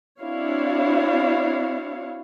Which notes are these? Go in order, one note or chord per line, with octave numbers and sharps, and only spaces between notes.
C4 D4 E4 F#4 C#5 F5